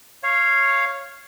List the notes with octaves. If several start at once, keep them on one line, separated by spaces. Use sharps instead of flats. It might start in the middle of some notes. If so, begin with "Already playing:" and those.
C#5 F5